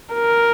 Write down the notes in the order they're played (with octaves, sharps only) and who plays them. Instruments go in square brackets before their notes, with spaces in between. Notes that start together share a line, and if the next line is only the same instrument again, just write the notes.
[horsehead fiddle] A#4